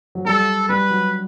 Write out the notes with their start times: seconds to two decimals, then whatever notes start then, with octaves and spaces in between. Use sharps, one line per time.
0.15 F#3
0.25 G3 A4
0.69 G3 B4
0.90 F#3